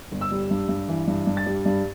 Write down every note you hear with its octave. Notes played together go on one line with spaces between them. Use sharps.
G1
E6
G3
G2
G2
E3
G2
G2
A6
G3
G2